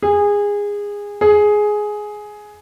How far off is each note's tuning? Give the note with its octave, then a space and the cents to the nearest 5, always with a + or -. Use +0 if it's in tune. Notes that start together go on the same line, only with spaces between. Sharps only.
G#4 -20
G#4 +10